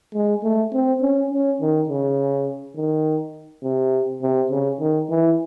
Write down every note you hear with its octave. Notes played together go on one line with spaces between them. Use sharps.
G#3
A3
C4
C#4
C#4
D#3
C#3
D#3
C3
C3
C#3
D#3
E3